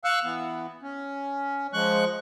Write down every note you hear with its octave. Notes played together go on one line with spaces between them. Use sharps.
F5 C#6 E6 F#6
E3 B3
C#4
F3 G#3 C#6 F#6